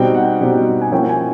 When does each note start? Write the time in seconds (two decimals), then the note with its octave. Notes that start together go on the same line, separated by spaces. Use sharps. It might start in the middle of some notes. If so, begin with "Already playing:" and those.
Already playing: B2 G3 C4 D#4 G5
0.15 F#5
0.41 B2 G3 C4 D#4
0.82 G#5
0.91 F3 A#3 C#4 E4 G5
1.09 G#5